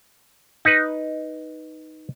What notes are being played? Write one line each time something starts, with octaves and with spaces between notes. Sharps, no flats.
D#4 B4